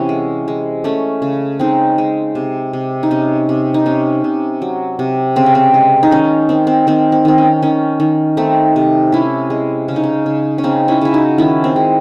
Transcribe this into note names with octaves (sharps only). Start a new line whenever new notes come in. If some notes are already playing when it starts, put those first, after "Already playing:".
Already playing: C3 E3 C#4 F#4
G#3
G#3
A3 C#4
C#3
G#3 C4 D#4
G#3
C3
C3
D#4
C3 C#4
C3
D#4
C3 C#4
C3
F#3
C3
C#3 C4
C#4
C4
G#3
D#4
D#3 C#4
D#3 C4
C4
D#3 C4
C4
D#3 C4
C#4
D#3 C#4
D#3
A3 C4 D#4
C3
C3 C#4 E4
G#3
C#3 C#4
D#4
C#4
C#3
C#4
C#3 C4 D#4
C#4 E4
C#3 E4
D#4 F#4
D#3 C#4 E4
C4
G#3